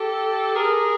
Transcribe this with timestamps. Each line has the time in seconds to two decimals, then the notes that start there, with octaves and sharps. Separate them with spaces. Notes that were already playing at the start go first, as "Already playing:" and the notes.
Already playing: G4 A4
0.55 G#4 A#4